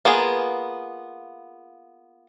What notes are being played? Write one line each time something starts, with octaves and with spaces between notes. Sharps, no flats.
A#3 B3 F4 G#4